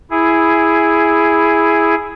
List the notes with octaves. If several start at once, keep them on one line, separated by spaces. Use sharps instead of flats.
E4 G#4